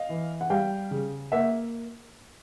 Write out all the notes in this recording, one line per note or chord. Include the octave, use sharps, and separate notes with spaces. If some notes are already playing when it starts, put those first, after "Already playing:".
Already playing: D#5 F5
E3
F#5
G3 F5 G5
C#3
A#3 E5 F#5